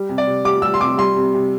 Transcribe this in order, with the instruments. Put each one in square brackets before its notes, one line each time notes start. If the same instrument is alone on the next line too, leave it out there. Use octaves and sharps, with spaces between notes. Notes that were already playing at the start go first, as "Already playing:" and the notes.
Already playing: [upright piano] G3
C3
D5
C3
G3 D6
G3 E6
C6
C3 D6
G3 C6
C3
C3